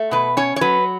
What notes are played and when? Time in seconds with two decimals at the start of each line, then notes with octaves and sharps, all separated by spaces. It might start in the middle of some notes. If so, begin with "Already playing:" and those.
Already playing: A3
0.11 B2 B4
0.37 C#4 C#5
0.56 C#5
0.61 F#3 B4